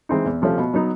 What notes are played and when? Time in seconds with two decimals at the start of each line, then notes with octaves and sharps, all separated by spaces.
0.09 E3 G#3 C4 D#4
0.26 E2
0.42 C3 F3 A3 C#4
0.58 B2
0.74 F#3 B3 D#4